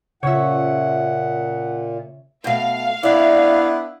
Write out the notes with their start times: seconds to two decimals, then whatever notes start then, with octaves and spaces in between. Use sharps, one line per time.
0.23 A#2 C#3 F4 C#5 E5 F#5
2.44 B2 A3 F5
3.03 B3 D4 E4 D5 E5